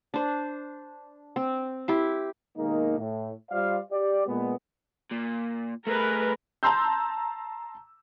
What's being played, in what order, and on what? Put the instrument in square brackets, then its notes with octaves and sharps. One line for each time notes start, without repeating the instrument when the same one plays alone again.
[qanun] D4 C5
C4
E4 G4 C6
[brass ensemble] D#2 B2 D#3 G#3 A#3 D#4
A2
G3 F4 C5 D5 F5
G4 D5
A#2 G#3 B3
[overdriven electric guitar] A#2
[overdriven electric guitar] A3 G#4 [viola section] A#4 B4
[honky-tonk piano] A5 A#5 C6 E6 G6